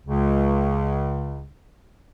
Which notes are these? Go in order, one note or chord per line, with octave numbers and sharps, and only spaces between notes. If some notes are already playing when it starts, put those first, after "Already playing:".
C#2 C#3